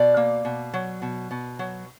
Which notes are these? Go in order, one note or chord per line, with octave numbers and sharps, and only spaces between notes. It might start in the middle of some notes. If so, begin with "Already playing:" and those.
Already playing: B2 D5
A#3
B2
F#3
B2
B2
F#3